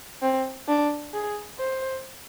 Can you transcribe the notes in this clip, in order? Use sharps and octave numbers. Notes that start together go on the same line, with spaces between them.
C4
D4
G#4
C5